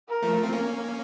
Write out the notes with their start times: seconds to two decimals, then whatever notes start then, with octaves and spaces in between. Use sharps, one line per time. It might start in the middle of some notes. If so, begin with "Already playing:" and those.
0.09 A#4
0.22 F3 A3
0.43 C4
0.53 A#3 C#4